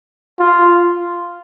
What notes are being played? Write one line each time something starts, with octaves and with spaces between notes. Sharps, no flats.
F4